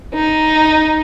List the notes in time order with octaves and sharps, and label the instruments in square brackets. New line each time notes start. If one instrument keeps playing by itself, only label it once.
[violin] D#4